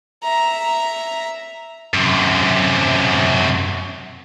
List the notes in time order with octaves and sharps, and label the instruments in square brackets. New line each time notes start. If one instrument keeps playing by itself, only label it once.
[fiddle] E5 A#5
[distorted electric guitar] F#2 C3